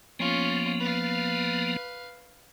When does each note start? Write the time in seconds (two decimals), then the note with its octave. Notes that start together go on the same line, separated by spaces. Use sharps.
0.19 F3 A#3 B3 C#4 F4
0.80 B4 F5